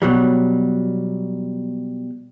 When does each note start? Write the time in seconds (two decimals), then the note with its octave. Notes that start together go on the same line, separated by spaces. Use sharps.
0.02 B2 F#3 G3